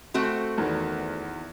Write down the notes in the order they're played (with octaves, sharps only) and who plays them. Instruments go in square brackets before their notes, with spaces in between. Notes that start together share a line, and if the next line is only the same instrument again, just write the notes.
[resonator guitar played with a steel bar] A3 C4 F#4
[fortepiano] E2 D#3